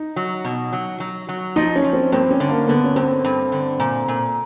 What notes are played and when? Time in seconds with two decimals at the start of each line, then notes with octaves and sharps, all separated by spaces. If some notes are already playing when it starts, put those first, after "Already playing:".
Already playing: D#4
0.16 F#3
0.45 B2
0.73 F#3
1.00 F#3
1.29 F#3
1.56 F3 D#4
1.76 C#4
1.84 F3
1.93 C4
2.12 G2 C4
2.31 C#4
2.40 D3
2.49 A#3
2.68 D3 B3
2.84 C#4
2.96 G2 C4
3.24 G2
3.52 D3
3.80 A#2
4.08 A#2